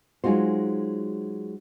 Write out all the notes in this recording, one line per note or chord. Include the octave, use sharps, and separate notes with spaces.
F#3 G#3 D#4 F4 F#4 C5